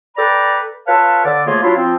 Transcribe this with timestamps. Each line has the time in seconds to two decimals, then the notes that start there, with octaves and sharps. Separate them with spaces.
0.17 A4 B4 D5 G5 A#5 B5
0.88 F4 A4 B4 C#5 F5 A5
1.25 D3 D5
1.47 F3 A3 A#3 F4 G#4 C#5
1.63 F#3 D4 E4 F4
1.76 F3 C4 F4